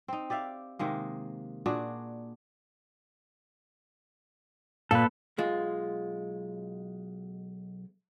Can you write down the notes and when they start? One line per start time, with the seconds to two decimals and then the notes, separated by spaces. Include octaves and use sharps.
0.08 C4 D#4
0.30 G4 D5 E5 F5
0.79 C3 D#3 G#3 A#3
1.66 A#2 D4 F#4 G#4
4.91 A#2 A4 B4
5.38 B1 G#3 F4